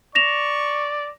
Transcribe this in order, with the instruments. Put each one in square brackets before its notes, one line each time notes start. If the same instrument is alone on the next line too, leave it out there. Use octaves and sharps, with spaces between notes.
[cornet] D5 [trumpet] C#6 [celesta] A#6 E7 F7